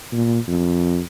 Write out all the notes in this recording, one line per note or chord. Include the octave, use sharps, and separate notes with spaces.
A#2
F2